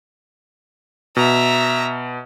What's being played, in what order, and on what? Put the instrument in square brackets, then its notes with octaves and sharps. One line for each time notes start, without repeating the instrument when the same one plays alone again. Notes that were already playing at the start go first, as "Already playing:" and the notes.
[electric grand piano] B2 [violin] E5 A#5